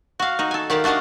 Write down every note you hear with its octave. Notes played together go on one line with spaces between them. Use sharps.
F#4 F5
D#4 F#4
A4 G#5
D#3 G4 D5 F5 F#5
A3 D4 F#4 D#5 F5